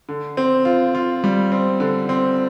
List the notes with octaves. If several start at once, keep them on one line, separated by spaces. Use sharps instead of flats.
D3
C4
F4
F4
G3
C4
D3
C4